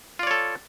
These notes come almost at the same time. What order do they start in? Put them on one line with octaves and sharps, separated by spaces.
F4 D5 C#5 A4